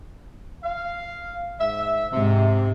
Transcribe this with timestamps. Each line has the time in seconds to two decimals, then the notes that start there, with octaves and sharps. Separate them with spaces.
0.64 F5
1.60 G#2 E5
2.13 G#2 C3